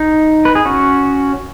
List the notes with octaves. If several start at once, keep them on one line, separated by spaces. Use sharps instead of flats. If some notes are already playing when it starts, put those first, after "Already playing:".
Already playing: D#4
B4
G#4
C#4 F#4